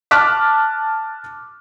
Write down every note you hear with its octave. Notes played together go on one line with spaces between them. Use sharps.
A5 D6 F6 F#6 B6